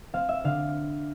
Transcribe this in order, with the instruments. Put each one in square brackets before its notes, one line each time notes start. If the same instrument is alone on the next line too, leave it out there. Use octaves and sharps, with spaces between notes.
[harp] C4 F5
E5
D3 F5